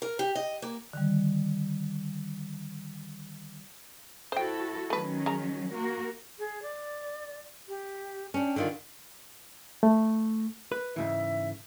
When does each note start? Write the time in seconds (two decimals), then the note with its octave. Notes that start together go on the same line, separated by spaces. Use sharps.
0.02 A#4
0.19 G4
0.35 D#5
0.62 A#3
0.93 D3 D#3 G3
4.32 E4 F#4 A4 C5 G5
4.90 D#3 F#3 A3 C#4 B4
5.26 C#3 A#5
5.73 A#3 F#4 A#4
6.39 G#4
6.62 D5
7.69 G4
8.34 C#4 D4 G5
8.56 D3 D#3 F4
9.83 A3
10.72 B4
10.96 G#2 C#3 E3 E5